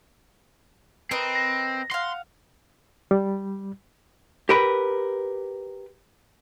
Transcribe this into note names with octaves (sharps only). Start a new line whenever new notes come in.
C4 A#4 B4 D#5
A#6
F5 F#5 C6
G3
G4 A#4 B4